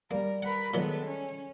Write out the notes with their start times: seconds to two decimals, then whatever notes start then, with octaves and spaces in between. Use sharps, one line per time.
0.11 G3 A#3 A#4 D5
0.42 A#4 B4 F#5 B5
0.74 A#2 D#3 F#3 G#3 B3 A4
1.05 C#4